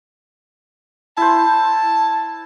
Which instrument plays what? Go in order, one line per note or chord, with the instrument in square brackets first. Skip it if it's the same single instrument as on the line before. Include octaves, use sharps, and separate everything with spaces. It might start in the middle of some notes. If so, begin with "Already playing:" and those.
[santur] E4 C5 [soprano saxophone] A5